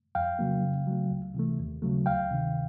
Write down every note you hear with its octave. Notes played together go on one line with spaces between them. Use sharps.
F2 F5 G5
C#3 F#3 A#3
C#3
F#3 A3
C#2
C3 E3 A3
D#2
C#3 F#3 A3
D2 F5 G5
C3 D#3